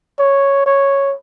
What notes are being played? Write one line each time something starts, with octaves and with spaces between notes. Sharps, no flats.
C#5
C#5